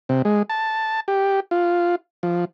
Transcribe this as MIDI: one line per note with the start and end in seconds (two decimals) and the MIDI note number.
0.09 0.22 48
0.25 0.43 56
0.50 1.00 81
1.08 1.40 67
1.51 1.95 65
2.23 2.45 53